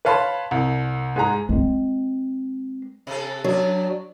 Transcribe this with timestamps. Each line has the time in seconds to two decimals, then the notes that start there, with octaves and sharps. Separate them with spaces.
0.05 B4 C#5 F5 A5 B5 C6
0.51 C2
1.16 G#2 G#3 G#4 A#5
1.49 G#3 C4
3.07 C3 A4
3.44 F#2 F#3 D4